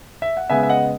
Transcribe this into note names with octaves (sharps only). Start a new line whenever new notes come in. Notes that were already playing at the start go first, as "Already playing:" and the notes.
E5
F#5
C#3 G#3 B3 E5 G#5
E5
D#5 F#5